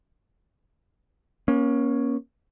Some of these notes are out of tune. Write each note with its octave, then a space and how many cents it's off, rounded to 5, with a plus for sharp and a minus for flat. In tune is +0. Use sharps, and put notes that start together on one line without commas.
A#3 +35 C#4 +0